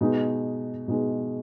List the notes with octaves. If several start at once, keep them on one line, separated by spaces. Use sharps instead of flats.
B2 G#3 D#4
B2 G#3 D#4